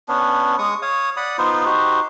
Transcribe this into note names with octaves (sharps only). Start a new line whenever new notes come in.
B3 C#4 D4
G#3 C#6 D#6
C#5 F5 D#6
D5 F#5 B5 D#6
B3 D#4 F4 C5
D#4 F#4 G4 C5